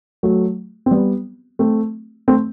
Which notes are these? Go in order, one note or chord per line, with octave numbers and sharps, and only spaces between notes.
F#3 A3
C4
G3 B3
A3 C4
A3 C4